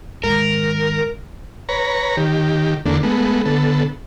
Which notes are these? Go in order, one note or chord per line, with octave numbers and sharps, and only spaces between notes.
G#2 D#3 A#4
B4 C#5 A#5
D#3 G4
E2 D3 A3 A#3 D4
G#3 A3 B3
D3 B3 A4